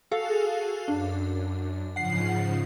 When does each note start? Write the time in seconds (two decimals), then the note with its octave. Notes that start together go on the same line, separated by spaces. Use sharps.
0.11 F#4 G#4 A4 F5
0.88 F#2 D4
1.96 G#2 C#3 F3 F#5 C7